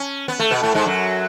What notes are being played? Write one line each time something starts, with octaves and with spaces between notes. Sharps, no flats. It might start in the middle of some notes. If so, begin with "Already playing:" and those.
Already playing: C#4
B3
A3
B2 B3
A2 A3
G#2 G#3
F#2 F#3